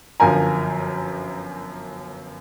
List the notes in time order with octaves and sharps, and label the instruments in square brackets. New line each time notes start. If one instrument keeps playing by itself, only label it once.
[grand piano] G1 F#2 F3 A#4 G#5 A#5